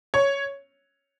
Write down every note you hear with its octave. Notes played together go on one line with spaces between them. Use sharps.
C#5